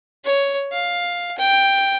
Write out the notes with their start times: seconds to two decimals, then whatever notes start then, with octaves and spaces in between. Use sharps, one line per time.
0.25 C#5
0.72 F5
1.38 G5